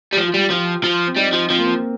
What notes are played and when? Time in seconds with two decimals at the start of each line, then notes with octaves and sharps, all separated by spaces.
0.13 G3
0.17 F3
0.28 F4
0.34 G3 G4
0.50 F3 F4
0.84 F3
1.07 C4
1.17 G3 D#4
1.33 F3
1.50 F3 C4
1.58 A#3
1.66 C4